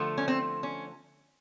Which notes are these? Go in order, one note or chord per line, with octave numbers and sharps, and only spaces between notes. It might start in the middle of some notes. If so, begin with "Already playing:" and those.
Already playing: D3 F3 A3
C#4
C4
C#4